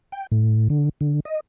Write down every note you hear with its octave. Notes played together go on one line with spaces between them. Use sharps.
G5
A2
D3
D3
D#5